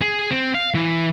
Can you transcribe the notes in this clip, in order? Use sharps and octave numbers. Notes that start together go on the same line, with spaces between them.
G#4
C4
F5
E3